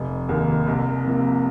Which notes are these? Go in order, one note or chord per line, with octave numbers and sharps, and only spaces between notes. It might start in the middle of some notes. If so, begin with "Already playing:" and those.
Already playing: F1
D#2 D#3 A#3
C2
C3 F3 A#3